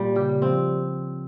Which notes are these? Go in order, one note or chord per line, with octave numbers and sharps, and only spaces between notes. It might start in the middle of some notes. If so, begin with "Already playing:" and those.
Already playing: A#2 G3
C#3 G4
C#3
F3 C4